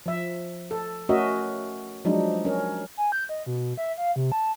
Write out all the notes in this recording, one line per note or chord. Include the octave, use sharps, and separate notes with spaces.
F3 E5
A4
A3 C#4 F#4 A#4 D#5 E5
F3 F#3 G#3 D4 D#4
C#4 A#4
G#5
G6
D#5
B2
E5
F5
C3
A5